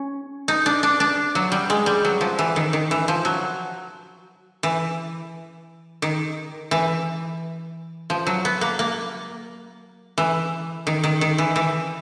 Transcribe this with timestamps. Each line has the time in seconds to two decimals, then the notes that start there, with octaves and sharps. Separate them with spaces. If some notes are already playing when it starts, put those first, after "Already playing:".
Already playing: C#4
0.48 D#4
0.66 D4
0.83 D4
1.00 D4
1.35 F#3
1.52 G3
1.70 G#3
1.86 G3
2.05 F#3
2.21 F3
2.39 E3
2.56 D#3
2.73 D#3
2.91 E3
3.08 F3
3.25 F#3
4.63 E3
6.02 D#3
6.71 E3
8.10 F3
8.27 F#3
8.45 B3
8.61 A#3
8.79 A#3
10.18 E3
10.87 D#3
11.04 D#3
11.21 D#3
11.38 E3
11.56 E3